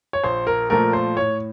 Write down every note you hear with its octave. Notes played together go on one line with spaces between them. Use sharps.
C#5
A#1 C5
A#4
A#2 F3 A3 A#4
C5
A2 C#5